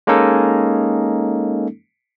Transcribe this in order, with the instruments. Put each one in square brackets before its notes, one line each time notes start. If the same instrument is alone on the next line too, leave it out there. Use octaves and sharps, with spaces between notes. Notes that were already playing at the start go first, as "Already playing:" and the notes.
[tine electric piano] G#3 A#3 C#4 D#4 A4